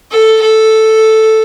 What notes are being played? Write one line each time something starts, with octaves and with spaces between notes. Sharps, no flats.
A4
A4